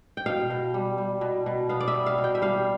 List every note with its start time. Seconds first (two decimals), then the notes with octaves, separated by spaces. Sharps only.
0.17 G5
0.26 B2 F5
0.50 B2
0.74 G3
0.98 G3
1.21 B2
1.46 B2
1.69 B3 F5
1.80 D5
1.88 E5
1.94 G3
2.06 F5
2.18 B2
2.24 G5
2.35 E5
2.42 G3 F5